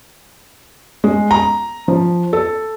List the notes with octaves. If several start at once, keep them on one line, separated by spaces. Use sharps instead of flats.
G#3
A#5
F3
A4